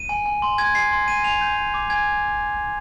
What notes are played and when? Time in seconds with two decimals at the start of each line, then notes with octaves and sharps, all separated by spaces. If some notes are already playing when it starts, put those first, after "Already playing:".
Already playing: D#7
0.09 G#5
0.26 G#5
0.42 C6
0.58 G#5 G#6
0.75 G#5 C7
0.92 C6
1.08 G#5 D#7
1.24 G#5 F7
1.41 G6
1.57 G#5
1.74 D6
1.90 G#5 G#6